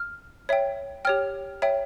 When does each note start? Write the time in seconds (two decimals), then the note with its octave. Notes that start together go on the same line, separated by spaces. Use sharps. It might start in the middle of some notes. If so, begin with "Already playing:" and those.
Already playing: F6
0.49 C#5 E5 G5
1.05 G4 C#5 G5 F6
1.62 C#5 E5 G5